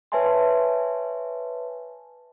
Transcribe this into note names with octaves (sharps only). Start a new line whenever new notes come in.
B4 C#5 E5 G#5 A5 C6